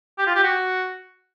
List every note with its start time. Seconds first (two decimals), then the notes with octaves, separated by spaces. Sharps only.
0.18 G4
0.27 F4
0.35 G4
0.43 F#4